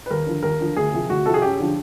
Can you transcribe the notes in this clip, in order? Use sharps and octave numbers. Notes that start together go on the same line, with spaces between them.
B4
D#2 A#4
D3 F3
D#2 A#4
D3 F3
D2 G#4
C3 F3
D2 F#4
C3 F3 A4
G#4
F#2 G4
D3 F3